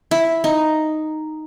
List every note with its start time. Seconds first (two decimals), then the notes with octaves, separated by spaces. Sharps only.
0.11 E4
0.44 D#4